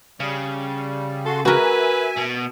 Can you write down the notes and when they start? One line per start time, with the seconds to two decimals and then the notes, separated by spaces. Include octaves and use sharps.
0.20 C#3 G3
1.26 F#4 A4 C6
1.45 F#4 A#4 B4 E5 G#5
2.16 B2